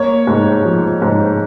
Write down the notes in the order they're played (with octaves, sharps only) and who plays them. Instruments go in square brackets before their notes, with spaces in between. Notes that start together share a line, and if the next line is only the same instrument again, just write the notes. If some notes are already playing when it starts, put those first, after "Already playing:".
Already playing: [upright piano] A#3 C#5
G#2
F3
G#2